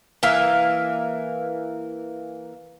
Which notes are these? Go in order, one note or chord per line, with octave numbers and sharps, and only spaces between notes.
E3 A#3 E5 F5